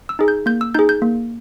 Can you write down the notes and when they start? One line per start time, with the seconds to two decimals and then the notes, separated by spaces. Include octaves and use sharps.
0.09 E6
0.19 D#4 G#4
0.28 G6
0.46 A#3 G6
0.61 E6
0.74 D#4 G#4 G6
0.89 G6
1.02 A#3